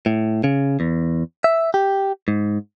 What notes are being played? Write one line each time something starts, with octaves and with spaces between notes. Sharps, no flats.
A2
C#3
E2
E5
G4
G#2